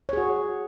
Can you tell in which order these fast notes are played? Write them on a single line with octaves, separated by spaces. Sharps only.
C#5 G#4 F#4